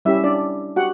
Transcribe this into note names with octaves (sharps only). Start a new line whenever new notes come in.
G3 C#4 E4 G4 E5
D4 D5
F#4 G4 F#5